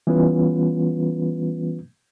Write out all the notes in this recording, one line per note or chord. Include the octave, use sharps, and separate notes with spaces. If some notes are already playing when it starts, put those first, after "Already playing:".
E3 G3 B3 C#4 F4 B4